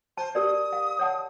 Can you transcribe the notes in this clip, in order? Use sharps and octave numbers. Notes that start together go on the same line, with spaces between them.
C5 A5
G4 A#4 D5 D#6
F5
C#5 F#5 A5